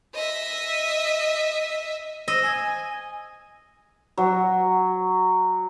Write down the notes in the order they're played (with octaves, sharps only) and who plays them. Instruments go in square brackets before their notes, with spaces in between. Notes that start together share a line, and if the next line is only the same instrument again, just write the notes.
[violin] D#5 E5
[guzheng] D#5 [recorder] E6
[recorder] G#5
[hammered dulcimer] F#3